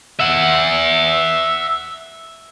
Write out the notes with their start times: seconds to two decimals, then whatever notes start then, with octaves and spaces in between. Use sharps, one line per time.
0.19 E5 F#5